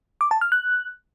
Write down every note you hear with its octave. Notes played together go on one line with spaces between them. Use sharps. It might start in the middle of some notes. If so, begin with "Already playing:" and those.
D6
A5
F6
F#6